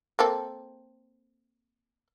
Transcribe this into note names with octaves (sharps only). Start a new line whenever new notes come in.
A#3 C4 A4